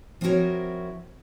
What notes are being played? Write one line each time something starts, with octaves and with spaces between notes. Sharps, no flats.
F3 C4 E4 F#4 A#4 C#5